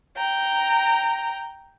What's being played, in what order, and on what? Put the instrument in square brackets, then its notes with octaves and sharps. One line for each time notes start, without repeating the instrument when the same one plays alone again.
[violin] G5 A#5